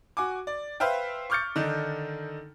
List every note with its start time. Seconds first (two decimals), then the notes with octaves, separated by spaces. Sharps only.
0.17 F#4 G#5 D6
0.47 D5
0.80 B4 C5 E5 F5 G5
1.30 C#6 D6 F6 G6 A6 C#7
1.56 D3 D#3 D#4